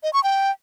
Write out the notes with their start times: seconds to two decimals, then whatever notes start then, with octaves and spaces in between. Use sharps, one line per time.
0.03 D#5
0.13 C#6
0.23 G5